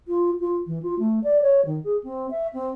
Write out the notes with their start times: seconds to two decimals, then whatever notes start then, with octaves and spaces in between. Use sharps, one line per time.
0.08 F4
0.40 F4
0.67 E3
0.83 F4
0.99 A3
1.24 D5
1.42 C#5
1.65 D#3
1.84 G#4
2.03 C4
2.31 E5
2.53 C4